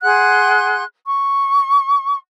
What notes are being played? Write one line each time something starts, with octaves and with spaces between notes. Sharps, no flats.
G#4 F#5 C6 F#6
C#6